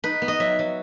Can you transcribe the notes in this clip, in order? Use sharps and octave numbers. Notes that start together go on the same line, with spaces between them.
D#4 B4
B3
D#5
F#3 E5
F#3